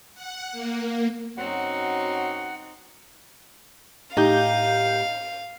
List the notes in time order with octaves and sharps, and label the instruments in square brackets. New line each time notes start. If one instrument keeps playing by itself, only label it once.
[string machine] F#5
A#3
[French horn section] F#2 C#5 [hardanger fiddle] C4 D#4 [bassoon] F#4 [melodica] F#5
[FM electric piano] A2 G4 G6 [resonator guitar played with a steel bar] D#4 [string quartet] F5